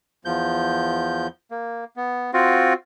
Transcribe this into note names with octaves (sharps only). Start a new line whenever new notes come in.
E2 F3 G6
A#3
B3
C4 F4 F#4